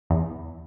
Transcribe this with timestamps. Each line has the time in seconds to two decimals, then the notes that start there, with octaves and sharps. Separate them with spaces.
0.10 E2